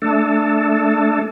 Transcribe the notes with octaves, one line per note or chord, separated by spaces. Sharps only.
A3 D4 A4